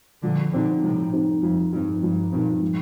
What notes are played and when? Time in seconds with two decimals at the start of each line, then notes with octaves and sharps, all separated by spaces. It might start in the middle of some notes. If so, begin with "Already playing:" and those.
0.23 A#2 D3 F3
0.52 A#2 D3 C4 D#4
0.83 A2 C3 F3
1.13 C4 D#4
1.42 F2 F3
1.72 G2 C4 D#4
2.03 G2 F3
2.32 G2 A#2 C4 D#4
2.62 F3